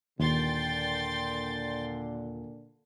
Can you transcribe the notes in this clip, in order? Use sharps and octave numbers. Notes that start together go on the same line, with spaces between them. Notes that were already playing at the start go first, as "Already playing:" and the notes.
D#2 A#2 D3 G5 C6 A6